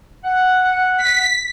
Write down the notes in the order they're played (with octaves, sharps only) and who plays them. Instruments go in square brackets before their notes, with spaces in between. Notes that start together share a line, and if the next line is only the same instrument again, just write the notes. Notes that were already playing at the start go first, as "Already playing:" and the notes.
[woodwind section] F#5
[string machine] B6